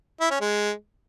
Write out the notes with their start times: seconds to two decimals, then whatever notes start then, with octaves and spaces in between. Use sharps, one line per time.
0.20 E4
0.30 C#4
0.40 G#3